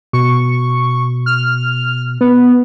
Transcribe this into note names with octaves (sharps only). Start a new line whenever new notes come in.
B2 C#6
F6
B3